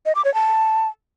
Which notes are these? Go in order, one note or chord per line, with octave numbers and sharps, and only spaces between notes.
D#5
D6
C#5
A5